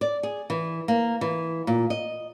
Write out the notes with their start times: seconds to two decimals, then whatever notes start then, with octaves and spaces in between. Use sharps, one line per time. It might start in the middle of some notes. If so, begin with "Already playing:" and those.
0.01 D5
0.23 G#4
0.50 E3
0.88 A#3
1.21 E3
1.67 A#2
1.90 D#5